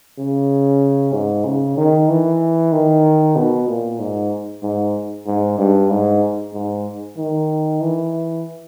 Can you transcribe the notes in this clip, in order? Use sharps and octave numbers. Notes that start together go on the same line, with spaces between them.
C#3
G#2
C#3
D#3
E3
D#3
B2
A#2
G#2
G#2
G#2
G2
G#2
G#2
D#3
E3